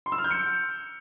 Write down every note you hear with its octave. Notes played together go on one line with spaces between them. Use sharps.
C6
E6
F6
G6
C#7